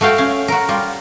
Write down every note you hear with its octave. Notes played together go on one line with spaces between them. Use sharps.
A3 F#4 F5 G5 A5
C#4 F5
F#4 A#4
G3 F4